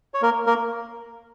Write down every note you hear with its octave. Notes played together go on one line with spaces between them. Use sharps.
C#5
A#3 A#4
A#3 A#4